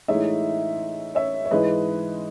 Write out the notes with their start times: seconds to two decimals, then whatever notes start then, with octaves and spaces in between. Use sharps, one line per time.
0.08 A2 E3 G#3 D#4 C#5 E5
1.15 C#5 E5
1.45 C#5
1.51 G#2 E3 G#3 B4 D#5